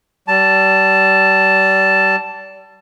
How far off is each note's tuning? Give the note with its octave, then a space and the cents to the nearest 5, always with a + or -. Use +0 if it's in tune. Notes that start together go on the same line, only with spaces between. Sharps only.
G3 -35 A5 +0